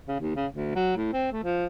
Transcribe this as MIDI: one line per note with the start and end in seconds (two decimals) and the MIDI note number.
0.08 0.17 49
0.20 0.33 39
0.36 0.46 49
0.53 0.75 38
0.75 0.93 54
0.96 1.10 45
1.13 1.30 60
1.32 1.42 57
1.44 1.66 53